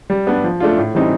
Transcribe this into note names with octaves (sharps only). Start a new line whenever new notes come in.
G3
B3 D4
F3
A3 D4 F4
A2
E3 G3 C4 D#4